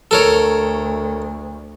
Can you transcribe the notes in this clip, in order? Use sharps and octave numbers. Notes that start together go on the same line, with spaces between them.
D2 A4 A#4 C#5